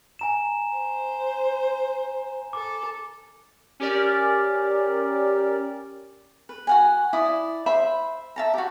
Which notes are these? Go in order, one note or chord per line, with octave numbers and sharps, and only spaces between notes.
G#5 A#5 E7
C5
A4 D6
C#4 G4 A#4 D5
B4
F#4 F#5 G#5
E4 D5 D#6
C5 E5 B5
E5 A5 A#5
F#4 G4